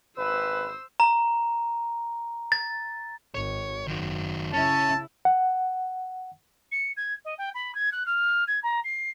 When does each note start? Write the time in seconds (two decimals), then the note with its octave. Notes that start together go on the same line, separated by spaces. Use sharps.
0.18 G#1 B4 C5 E6
1.00 A#5
2.52 A6
3.35 G#1 C#5
3.87 F#1 D#3 F#4
4.54 C#3 C#4 E4 A5
5.25 F#5
6.72 C#7
6.97 G#6
7.25 D#5
7.38 G5
7.55 B5
7.75 G#6
7.92 F#6
8.06 F6
8.48 G#6
8.63 A#5
8.84 C7